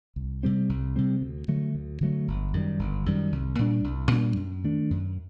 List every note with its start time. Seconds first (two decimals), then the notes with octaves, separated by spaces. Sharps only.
0.16 C2
0.43 C3 G3 C4
0.69 C2
0.96 C3 G3 C4
1.21 D2
1.48 D3 F#3 A3
1.75 D2
2.01 D3 F#3 A3
2.28 G1
2.53 F#2 D#3 G3
2.79 G1
3.06 F#2 D#3 G3
3.32 C2
3.59 A#2 G3 D4
3.84 C2
4.11 A#2 G3 D4
4.37 F#2
4.64 D#3 A3 D4
4.91 F#2